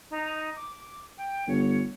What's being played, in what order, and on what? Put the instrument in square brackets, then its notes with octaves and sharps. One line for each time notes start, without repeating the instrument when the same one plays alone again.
[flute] D#4
D6
G5
[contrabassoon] G1 [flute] C#5